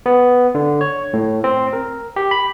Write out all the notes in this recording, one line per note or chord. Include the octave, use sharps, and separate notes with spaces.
B3
D3
C#5
A2
C4
A#4
G4
B5